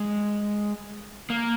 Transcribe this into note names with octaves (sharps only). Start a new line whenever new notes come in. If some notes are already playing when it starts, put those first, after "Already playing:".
Already playing: G#3
A#3